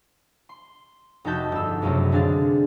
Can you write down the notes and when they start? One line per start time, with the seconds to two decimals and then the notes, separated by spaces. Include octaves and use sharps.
0.49 C6
1.24 F1 D#4 F#4 A5 G6 B6
1.52 G1 E6
1.82 C#2 F#2 C3 F#3 A3 C4
2.12 D3 C4 D4 G#4 F5 A6